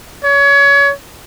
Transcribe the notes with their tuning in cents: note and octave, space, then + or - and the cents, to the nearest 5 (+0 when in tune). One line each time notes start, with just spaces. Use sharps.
C#5 +30